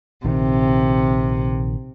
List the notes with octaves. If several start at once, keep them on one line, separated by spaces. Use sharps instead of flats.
A#1 C3 D#3